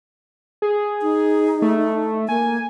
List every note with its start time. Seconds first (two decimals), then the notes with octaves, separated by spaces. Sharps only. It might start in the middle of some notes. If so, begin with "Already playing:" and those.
0.62 G#4
1.02 D#4
1.62 A3
2.28 A#3 G#5